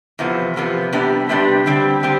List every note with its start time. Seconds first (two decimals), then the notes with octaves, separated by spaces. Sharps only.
0.19 E2 C3 F3 B3
0.56 E2 C3 F3 B3
0.93 C3 G3 B3 D4 G4
1.29 C3 G3 B3 D4 G4
1.66 D3 G3 C4 G4
2.03 D3 G3 C4 G4